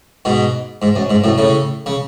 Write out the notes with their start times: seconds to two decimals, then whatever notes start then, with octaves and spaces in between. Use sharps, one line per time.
0.25 G#2 B2
0.82 G#2
0.96 F#2
1.10 G#2
1.24 F#2 A2
1.38 A2 C#3
1.86 C#3